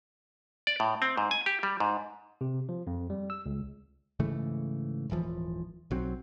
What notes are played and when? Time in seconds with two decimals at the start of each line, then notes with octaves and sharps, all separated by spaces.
0.67 D5
0.80 A2
1.02 C4
1.17 G#2
1.31 G#5
1.46 G4
1.63 G3
1.80 G#2
2.41 C3
2.69 F3
2.87 F2
3.10 G3
3.30 E6
3.46 C#2
4.19 G#2 C#3 E3 A3
5.10 D#1 G#1 E3 F3
5.91 B1 F#3 C4